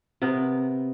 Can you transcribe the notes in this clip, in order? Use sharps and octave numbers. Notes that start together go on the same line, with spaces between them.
C3 B3 A#4